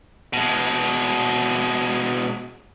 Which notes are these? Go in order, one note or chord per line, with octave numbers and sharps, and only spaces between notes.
B2 G#3